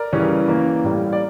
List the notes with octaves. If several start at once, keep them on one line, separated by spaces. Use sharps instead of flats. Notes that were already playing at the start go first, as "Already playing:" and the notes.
Already playing: A#4 D5
C#3 E3 G3 C#4
E3 A#3 C#4
A2 G3 A#3
D5